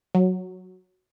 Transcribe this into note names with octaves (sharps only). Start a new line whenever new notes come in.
F#3